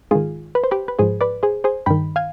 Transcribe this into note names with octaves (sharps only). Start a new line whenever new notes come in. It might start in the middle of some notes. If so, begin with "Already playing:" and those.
G#2 D#3 F4 G#4
B4
C5
G4 B4
B4
G#2 F3 G#4 C5
B4 D5
G#4 C5
G#4 C5
G2 D#3 G5 B5
F5 G#5